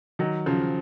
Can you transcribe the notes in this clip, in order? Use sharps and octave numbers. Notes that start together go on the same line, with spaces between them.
D#3 F#3
C#3 F3